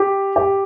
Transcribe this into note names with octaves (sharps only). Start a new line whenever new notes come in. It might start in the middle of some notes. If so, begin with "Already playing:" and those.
Already playing: G4
G4